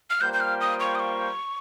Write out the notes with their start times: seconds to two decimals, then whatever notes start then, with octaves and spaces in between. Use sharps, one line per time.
0.10 F6
0.21 G3 A#3 F4 C5 G5 G6
0.34 G6
0.40 F6
0.61 D#6
0.80 C#6
0.95 D#6
1.00 C#6